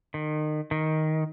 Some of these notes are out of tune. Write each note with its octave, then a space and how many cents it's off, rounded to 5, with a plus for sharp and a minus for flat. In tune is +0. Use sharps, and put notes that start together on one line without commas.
D#3 -30
D#3 +10